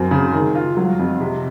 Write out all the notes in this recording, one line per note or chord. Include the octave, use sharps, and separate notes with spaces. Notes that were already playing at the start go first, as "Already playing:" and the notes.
Already playing: F#2 C4
C#3
D#3
F4
F#3
F2
C3